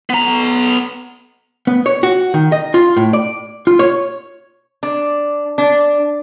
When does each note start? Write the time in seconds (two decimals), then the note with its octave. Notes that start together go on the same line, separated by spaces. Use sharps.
0.10 B3 A#5
1.67 B3
1.86 C#5
2.03 F#4
2.34 D#3
2.52 D#5
2.74 F4
2.96 A2
3.13 D5
3.67 F4
3.79 C#5
4.83 D4
5.58 D4